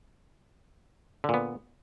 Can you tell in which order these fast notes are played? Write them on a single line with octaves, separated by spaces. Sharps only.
D3 A#2 B3